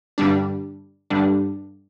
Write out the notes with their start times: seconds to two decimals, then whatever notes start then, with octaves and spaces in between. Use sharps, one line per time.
0.18 G2 D3 G3 D4
1.10 G2 D3 G3 D4